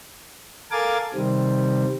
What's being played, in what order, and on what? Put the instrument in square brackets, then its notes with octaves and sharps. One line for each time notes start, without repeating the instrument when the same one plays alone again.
[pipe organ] A4 A#4 F5 G#5 D6 A6
C3 D#3 G3 C4